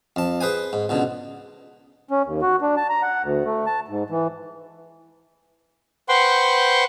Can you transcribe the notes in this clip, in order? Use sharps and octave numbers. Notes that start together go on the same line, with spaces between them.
F2 A5
G#4 B4 C5 G#5
G#2
C#2 B2 D3
C#4
D#2
F#4
D4
A5
A#5
F#5
D2
A3
A5
G#2
E3
B4 C5 F#5 G5 C6 C#6